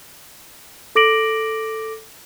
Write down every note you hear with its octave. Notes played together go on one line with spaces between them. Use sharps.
A4 D6 A#6 D7 F#7